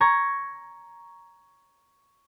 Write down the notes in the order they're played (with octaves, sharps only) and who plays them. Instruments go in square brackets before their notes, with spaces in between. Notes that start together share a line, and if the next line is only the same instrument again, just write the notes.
[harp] A#5 C#6 G#6